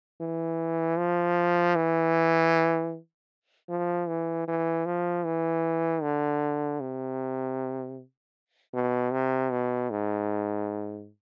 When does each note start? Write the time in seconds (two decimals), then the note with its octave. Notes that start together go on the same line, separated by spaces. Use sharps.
0.21 E3
0.98 F3
1.76 E3
3.69 F3
4.09 E3
4.48 E3
4.86 F3
5.25 E3
6.02 D3
6.80 C3
8.74 B2
9.12 C3
9.51 B2
9.90 G#2